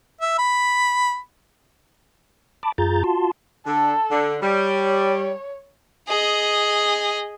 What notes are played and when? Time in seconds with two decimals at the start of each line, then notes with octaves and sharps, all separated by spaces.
0.21 E5
0.38 B5
2.63 A5 B5 D6
2.78 F#2 F4 G#4 A#5 G6 A6
3.04 F4 F#4 A5 C6
3.67 D3 A4
4.11 D3
4.42 G3 C#5
6.09 G#4 D#5